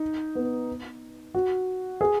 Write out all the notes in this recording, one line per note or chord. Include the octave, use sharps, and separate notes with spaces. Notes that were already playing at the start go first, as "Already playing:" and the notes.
Already playing: D#4
B3
F#4
G#4